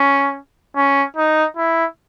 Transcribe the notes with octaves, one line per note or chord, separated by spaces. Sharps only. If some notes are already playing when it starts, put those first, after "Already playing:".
Already playing: C#4
C#4
D#4
E4